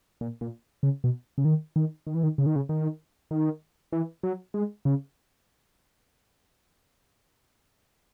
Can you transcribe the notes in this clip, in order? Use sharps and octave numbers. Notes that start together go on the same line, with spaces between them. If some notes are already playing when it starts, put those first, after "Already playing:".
A#2
A#2
C#3
B2
C#3
D#3
D#3
D#3
E3
D#3
C#3
D#3
C#3
D#3
D#3
E3
F#3
G#3
C#3